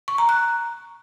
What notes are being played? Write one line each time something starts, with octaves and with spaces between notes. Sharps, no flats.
C#6
A#5
F#6